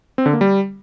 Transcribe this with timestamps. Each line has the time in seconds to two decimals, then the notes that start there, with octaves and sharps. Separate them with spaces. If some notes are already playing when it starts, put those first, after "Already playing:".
0.18 C4
0.26 D3
0.33 A#3
0.41 G3